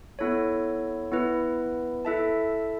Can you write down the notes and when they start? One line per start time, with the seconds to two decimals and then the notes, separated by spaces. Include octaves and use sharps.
0.19 B3 E4 A4 C#5
1.12 B3 E4 B4
2.05 E4 A4 E5 A5